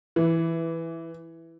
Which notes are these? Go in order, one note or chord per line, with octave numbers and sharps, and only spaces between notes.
E3